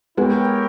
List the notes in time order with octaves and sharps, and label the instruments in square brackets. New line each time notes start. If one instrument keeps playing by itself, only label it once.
[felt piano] G#3 B3 [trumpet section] E4 G4 A#4 C#5 G5